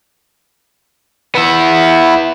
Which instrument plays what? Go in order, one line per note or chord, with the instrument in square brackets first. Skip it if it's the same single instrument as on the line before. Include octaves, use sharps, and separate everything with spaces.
[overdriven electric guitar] B3 E4